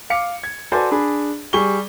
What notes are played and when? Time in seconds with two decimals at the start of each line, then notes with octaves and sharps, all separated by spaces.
0.10 F5 D6 C#7
0.43 G#6
0.72 F#4 A4 B4 C5 D5 G#5
0.91 D4 G#4 B5
1.53 G3 G#4 C#6 G7